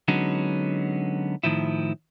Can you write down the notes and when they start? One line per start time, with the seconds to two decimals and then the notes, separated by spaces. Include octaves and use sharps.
0.08 D3 F#3 G#3 B3 C#4 D#4
1.43 A2 D#3 F3 E4